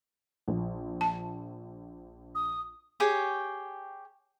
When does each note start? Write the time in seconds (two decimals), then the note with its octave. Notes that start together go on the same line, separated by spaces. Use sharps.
0.48 A#1
1.01 A5
2.35 D#6
3.00 G4 G#4 C#5 G5